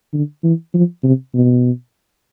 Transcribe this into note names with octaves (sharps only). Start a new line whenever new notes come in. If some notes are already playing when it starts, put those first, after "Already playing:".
D3
E3
F3
C3
B2